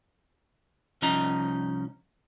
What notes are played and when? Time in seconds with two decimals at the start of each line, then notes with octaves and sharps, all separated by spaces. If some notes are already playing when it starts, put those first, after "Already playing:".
1.02 C2 F3 C#4 D#4 D#5 A#5